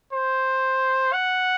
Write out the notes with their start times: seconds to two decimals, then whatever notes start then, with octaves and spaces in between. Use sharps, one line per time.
0.13 C5
1.13 F#5